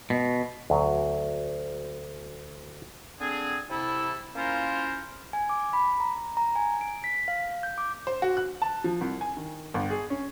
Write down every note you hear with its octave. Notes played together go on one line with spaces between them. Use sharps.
B2
D2 F#3
D3 C4 D4 G#4
C3 E4 A4
A#3 C#4 E4 F4 A#4 C5
G#5
D6
B5
A#5
A#5
G#5
D7
B6
F5
G6
D6
C5
F#4
F#6
A5
F3
C2
G#5
D#3
G1
G#4
C#4